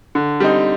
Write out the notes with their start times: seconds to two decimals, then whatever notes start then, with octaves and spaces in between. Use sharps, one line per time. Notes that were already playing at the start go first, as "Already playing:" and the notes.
0.15 D3
0.40 G3 C4 D#4